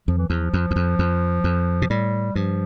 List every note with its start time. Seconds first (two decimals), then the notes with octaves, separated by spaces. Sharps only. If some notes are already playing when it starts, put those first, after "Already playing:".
0.08 F2 F3
0.18 E3
0.29 E2 F3
0.53 F2
0.71 E2
0.76 F2
0.99 F2
1.44 F2
1.82 B2
1.90 A2 G3
2.35 G2 F3